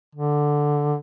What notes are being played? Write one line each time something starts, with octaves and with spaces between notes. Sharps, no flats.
D3